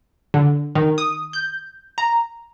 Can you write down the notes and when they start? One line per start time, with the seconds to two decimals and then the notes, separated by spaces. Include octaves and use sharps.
0.34 D3
0.75 D#3
0.98 D#6
1.33 G6
1.98 A#5